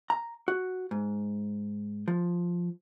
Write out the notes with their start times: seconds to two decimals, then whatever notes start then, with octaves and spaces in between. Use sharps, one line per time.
0.10 A#5
0.48 F#4
0.91 G#2
2.08 F3